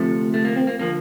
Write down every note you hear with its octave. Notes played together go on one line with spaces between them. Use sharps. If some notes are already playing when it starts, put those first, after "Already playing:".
Already playing: D2 C3 F3 A3
A3
A#3
C4
A#3
D3 F3 A#3